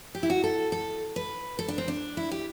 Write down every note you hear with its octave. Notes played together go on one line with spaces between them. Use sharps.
G4
E4
F#4
A4
A4
B4
A4
D4
C4
D4
E4
G4